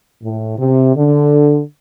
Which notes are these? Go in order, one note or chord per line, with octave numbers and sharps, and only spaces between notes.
A2
C3
D3